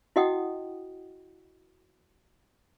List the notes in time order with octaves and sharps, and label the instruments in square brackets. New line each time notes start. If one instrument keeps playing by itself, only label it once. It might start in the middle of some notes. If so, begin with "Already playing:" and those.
[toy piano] E4 F#4 D#5 F#5 G5 D#6